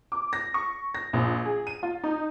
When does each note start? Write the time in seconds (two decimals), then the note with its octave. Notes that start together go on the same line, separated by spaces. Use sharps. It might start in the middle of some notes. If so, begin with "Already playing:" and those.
0.12 D6
0.33 A#6
0.54 C#6
0.94 A#6
1.13 A#1
1.45 G#4
1.67 D#7
1.83 F4
2.04 D#4